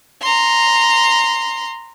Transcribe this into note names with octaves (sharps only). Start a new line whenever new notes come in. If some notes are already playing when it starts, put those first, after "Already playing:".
A#5 C6